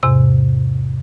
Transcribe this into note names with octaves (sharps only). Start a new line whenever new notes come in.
E2 G#2 C3 E6